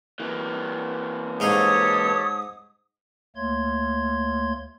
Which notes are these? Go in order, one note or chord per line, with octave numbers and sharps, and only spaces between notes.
E3 A#3
G#2 D#4 G4 A4 C#5 F5 D#6
D2 A3 A#3 C#5 C6 G#6